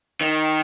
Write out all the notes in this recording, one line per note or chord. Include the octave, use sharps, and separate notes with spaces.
D#3